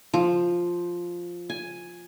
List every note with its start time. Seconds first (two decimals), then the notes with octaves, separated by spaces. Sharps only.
0.14 F3
1.50 G#5